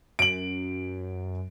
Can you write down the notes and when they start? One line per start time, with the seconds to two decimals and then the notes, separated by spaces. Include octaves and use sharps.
0.19 F#2 D7 F#7